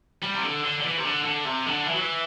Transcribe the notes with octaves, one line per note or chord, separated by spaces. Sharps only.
G3
C3
D3
D3
D3
E3
C3
D3
D3
C3
D3
E3
F#3
E3